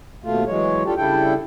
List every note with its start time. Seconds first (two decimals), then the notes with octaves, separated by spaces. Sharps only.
0.24 D#2 B2 A3 F4
0.47 E3 F#3 G#3 C#5
0.85 D4 F4 G4 A4
0.97 C#3 G3 D4 E4 A4 G5